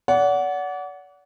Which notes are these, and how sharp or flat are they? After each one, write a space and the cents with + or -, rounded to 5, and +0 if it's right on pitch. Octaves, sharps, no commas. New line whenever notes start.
D5 -40 F#5 +0